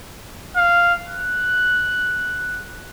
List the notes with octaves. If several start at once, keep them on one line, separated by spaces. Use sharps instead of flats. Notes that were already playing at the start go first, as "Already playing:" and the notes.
F5
F#6